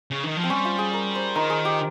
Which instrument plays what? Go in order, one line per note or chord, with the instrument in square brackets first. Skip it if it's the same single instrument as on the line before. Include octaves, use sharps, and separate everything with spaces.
[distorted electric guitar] C#3
D#3
F3
[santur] C4
[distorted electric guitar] G3 [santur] C#4
[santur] F4
G#4
A#4
C5
[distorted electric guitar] D#3 [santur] A#4
[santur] G#4
G4